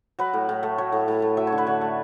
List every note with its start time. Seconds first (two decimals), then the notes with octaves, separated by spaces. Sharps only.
0.19 F#3 B4
0.33 A2
0.49 A2
0.63 A3
0.78 F#3 C#5
0.92 A2
1.08 A2
1.22 A3
1.37 F#3 E5
1.47 C#5
1.52 D3
1.58 B4
1.67 D3 C#5
1.81 A3